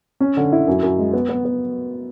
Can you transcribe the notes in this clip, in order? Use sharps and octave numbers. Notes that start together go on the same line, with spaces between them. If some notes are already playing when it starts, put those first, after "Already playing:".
C#4
D3
E4
F#2
F#2
G#3
B3
B3
B3